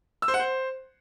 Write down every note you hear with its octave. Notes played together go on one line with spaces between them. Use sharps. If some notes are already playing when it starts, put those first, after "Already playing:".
E6
C5
F#5
C5